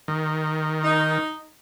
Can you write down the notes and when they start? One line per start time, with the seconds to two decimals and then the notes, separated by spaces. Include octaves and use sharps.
0.08 D#3
0.84 D#4